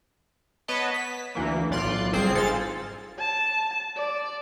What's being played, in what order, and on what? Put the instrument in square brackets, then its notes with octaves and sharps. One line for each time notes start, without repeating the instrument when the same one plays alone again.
[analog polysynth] B3 B4 C#5 D#5 A5
B6
D2 E3 A#3
B1 A2 F4 D5 C6 F#6
G1 C4 G#4 C5 C7
G#2 G#3 F4 A4 A6
[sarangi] A5
D5